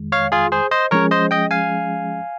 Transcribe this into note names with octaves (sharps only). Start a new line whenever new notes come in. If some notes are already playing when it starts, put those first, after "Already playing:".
Already playing: F2 D#3 G#3
C#5 F5
F4 G#4
G#4 C5
C5 D#5
F3 G#3 C#4 G#4 A#4 C#5
C5 D#5
D#5 G5
F5 G#5